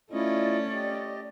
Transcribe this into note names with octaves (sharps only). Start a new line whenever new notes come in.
A3 C#4 E4 F4 D5 D#5
G4 D#5